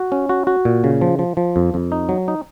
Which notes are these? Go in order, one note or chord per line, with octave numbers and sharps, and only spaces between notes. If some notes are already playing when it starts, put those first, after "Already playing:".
Already playing: F#4
C#4
F#4
F#4
A#2
C#3
F3
F3
F3
F2
F2
D#4
F#3
D#4